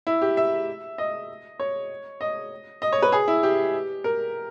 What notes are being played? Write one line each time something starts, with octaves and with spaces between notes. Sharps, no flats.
E4
G4
E5
D#5
C#5
D#5
D#5
C#5
B4
G#4
E4
G4
A#4